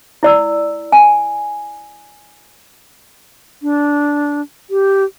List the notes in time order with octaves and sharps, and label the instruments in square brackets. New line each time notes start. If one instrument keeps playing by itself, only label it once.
[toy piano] E4 D5 E6
G#5
[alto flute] D4
G4